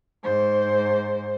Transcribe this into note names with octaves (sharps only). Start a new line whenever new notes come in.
G#2 C5